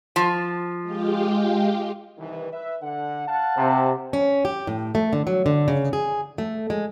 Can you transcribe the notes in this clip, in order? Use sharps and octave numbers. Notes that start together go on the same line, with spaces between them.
F3
G#3 F4 G4
C2 D#3 E3
B4 E5
D3 F#5
F5 F#5 A5
C3
C#4
G4
A2
A3
D3
F#3
D3
C#3
G#4
A3
G#3